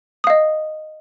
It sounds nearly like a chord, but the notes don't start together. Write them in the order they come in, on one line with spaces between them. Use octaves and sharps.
D#6 F5 D#5